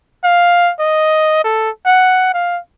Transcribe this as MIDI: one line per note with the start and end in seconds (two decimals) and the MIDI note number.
0.24 0.72 77
0.79 1.42 75
1.44 1.70 69
1.86 2.29 78
2.34 2.59 77